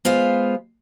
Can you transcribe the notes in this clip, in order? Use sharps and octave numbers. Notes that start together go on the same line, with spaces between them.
G#3 B3 F4 C5 F5